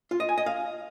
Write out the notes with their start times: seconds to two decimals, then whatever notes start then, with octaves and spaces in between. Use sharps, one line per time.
0.11 F4
0.20 D#5
0.29 G#5
0.38 D#5
0.46 F5